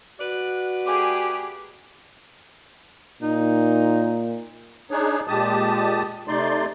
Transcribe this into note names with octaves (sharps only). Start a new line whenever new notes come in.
F#4 B4 D5 F#6
A3 G4 G#4 D6
A#2 D#4
D4 D#4 G#4 C#5
A#2 G#3 G4 A5 D#6
C3 A3 D#4 D5 C6